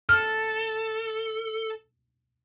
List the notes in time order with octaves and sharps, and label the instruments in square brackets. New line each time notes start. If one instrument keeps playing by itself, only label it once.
[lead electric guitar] A4 [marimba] F6